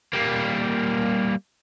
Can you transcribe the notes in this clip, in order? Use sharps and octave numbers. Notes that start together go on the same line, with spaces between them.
G3 A#3